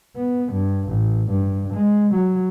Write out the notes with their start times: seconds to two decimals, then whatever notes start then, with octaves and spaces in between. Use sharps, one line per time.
0.16 B3
0.52 G2
0.89 A1
1.30 G2
1.73 G#3
2.13 F#3